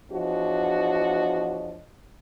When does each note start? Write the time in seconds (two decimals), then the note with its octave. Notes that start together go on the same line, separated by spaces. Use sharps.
0.11 E2 F3 D4 F#4 C#5 D#5